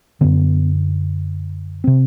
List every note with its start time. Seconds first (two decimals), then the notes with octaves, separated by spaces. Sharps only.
0.21 F#2 D3 B3
1.84 C3 C4